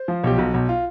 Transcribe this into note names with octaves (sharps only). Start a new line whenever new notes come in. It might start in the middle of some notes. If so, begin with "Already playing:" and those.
Already playing: C5
F3
B1 G4
B1 F#4
B1
F4